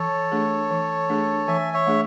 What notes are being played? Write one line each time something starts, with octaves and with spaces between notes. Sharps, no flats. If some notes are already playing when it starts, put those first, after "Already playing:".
Already playing: E3 A4 C#5
A3 D4 G#4
E3
A3 D4 G#4
E3 E5 G#5
C#5 E5
A3 D4 G#4